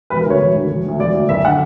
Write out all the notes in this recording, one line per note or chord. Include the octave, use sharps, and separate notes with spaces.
E1 B4
A#4
D2 D3 C#5
E1
D2 D3
E1
D2 D3
E1 D5
D2 D3
F#1 E5
D3 F#5